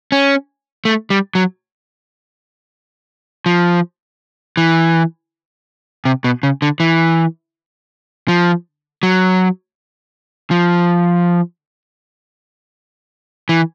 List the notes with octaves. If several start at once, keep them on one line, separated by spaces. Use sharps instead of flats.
C#4
A3
G3
F#3
F3
E3
C3
B2
C#3
D3
E3
F3
F#3
F3
E3